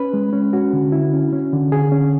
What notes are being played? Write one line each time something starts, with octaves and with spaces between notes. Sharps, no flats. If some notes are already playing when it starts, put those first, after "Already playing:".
Already playing: C#4 B4
G#3
C#4
C#4 F#4
D3
E4
C#4
C#4
D3
D3 G#4
C#4